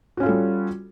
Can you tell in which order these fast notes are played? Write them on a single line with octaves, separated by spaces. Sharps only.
F#4 C#4 F4 A4 G3